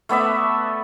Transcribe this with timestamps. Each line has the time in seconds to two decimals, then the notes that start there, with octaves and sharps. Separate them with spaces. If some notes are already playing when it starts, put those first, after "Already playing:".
0.09 A3 B3 D5 E5